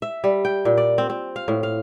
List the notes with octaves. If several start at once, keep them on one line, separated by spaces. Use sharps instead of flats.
E5
G3
G5
A#2
D5
C4
C4
F5
A2
F5